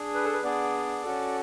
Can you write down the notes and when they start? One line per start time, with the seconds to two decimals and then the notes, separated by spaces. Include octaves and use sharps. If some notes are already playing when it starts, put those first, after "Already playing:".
Already playing: D4 G#4
0.14 B4
0.24 A4
0.33 B4
0.43 B3 D4 G#4 D5
1.03 C#4 F#4 A4